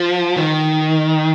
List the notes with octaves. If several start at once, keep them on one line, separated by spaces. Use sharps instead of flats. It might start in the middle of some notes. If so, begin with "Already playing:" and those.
Already playing: F3
D#3